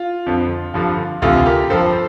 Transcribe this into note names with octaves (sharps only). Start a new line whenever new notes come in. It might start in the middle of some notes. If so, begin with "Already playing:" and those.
Already playing: F4
F2 D3 F3
G2 D3 F3
D2 C3 E3 F4 A4
G4 A#4
G2 F3 A4 C5